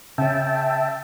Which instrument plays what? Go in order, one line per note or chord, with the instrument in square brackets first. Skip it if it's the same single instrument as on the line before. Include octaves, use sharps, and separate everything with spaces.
[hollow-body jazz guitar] C#3 C#4 [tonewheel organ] E5 G5 A5